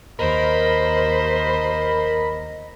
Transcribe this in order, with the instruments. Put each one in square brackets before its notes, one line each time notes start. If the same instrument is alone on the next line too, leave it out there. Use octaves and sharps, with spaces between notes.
[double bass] D#2 [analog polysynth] A#4 B5 [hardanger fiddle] C5 [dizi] D#5